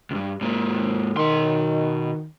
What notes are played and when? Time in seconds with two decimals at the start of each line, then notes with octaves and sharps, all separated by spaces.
0.11 C#2 G2
0.41 G#2 A#3
1.17 B2 D#3 C6